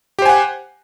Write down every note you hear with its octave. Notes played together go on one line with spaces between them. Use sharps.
G4 C5 F#5 G#5